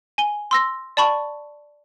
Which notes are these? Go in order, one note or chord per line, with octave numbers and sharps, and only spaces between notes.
G#5 G7
C6 E6 A#6
D5 A5 B5 C#6